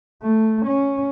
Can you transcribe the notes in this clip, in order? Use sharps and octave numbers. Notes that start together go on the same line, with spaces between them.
A3
C#4